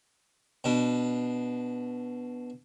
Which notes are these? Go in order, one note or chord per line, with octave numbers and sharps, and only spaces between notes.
B2 D4